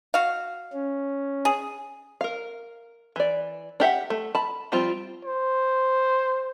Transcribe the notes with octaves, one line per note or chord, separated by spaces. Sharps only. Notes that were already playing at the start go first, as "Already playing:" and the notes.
F#4 F5
C#4
G#4
A#4 F5
E3 D5
D4 G4 E5 F#5
A3
A5 B5
F3 G3 C4 F4
C5